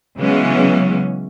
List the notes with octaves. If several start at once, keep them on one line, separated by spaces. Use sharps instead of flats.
C#3 E3 F#3 G#3 B3 C#4